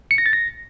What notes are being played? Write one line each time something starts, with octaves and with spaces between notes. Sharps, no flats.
C#7
A#6
A6
A#6